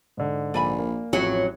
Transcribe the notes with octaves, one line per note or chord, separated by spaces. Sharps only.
G#2 D3
A#1 D5 G#5 B5
A#3
A1 F2 F#3